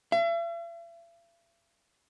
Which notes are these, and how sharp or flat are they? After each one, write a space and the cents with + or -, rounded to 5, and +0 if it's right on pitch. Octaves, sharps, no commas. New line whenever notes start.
E5 +45